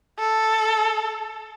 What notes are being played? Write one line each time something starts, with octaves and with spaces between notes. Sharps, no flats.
A4